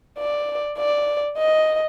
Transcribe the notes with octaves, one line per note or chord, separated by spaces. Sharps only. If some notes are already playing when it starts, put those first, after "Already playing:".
D5
D5
D#5